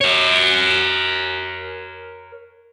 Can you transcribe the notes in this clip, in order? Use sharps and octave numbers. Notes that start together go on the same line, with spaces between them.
A#4 C#5